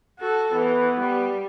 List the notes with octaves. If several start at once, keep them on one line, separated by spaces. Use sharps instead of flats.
F#4 A4
E3 B3
G3